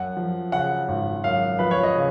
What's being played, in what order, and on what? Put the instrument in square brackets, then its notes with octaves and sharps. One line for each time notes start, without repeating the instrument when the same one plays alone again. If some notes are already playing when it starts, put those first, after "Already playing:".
Already playing: [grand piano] F#2 F#5
F3
C#3 F#5
G#1
F#2 F5
F3 B4
C#5
D#5
C#3